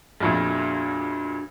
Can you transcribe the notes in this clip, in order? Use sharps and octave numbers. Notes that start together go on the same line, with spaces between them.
A#1 F2 A#2 D4 F#4 G#4